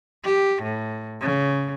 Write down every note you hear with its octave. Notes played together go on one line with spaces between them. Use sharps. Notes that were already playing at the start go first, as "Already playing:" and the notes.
G4
A2
C#3